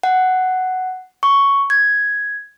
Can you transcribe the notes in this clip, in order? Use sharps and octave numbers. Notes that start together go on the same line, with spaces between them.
F#5
C#6
G#6